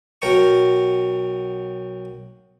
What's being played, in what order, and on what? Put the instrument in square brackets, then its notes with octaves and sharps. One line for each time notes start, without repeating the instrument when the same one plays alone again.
[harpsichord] B1 F#3 A#4 G5 A5 C#6